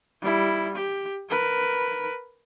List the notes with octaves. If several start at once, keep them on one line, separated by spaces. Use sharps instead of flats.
G3 E4
G4
A#4 B4